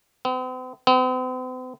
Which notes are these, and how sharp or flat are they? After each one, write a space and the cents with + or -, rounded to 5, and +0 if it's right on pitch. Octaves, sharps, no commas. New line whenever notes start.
C4 -45
C4 -45